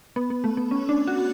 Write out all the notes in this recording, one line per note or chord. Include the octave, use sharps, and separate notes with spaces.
B3
B3
A3
B3
C#4
D4
F#4